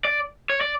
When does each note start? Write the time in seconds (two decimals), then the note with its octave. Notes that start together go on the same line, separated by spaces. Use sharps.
0.05 D5
0.50 C#5
0.61 D5